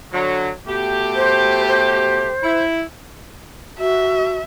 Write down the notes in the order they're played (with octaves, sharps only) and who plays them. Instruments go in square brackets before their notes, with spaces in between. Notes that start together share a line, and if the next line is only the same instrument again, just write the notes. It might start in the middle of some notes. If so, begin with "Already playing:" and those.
[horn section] D3 F#3
B2 A3 G4
[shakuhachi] C5
C5
[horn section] E4
[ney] F#4 [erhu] E5